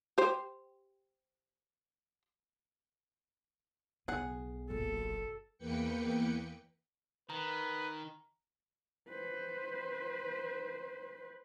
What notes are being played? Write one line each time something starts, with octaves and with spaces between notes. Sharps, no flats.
G4 C5
B1 C#3 B3 G#4 F#5
F#1 A#2 A4
E2 A#3 B4 G5 C#7
D#3 B4 A#5
B4 C5